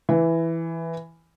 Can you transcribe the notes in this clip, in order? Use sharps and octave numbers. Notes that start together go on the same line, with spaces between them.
E3